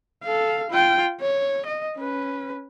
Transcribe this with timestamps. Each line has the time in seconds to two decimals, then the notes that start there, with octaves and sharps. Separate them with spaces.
0.23 A4 F5
0.70 F4 G5
1.21 C#5
1.66 D#5
1.96 C#4 B4